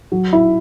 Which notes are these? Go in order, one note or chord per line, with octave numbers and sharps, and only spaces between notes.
F#3
E4